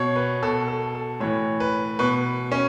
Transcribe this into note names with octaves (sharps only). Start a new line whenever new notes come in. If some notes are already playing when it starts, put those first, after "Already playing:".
Already playing: B2 C#5
B4
B2 A4
A4
A4
A2 E3 C#5
B4
B2 B4
C#4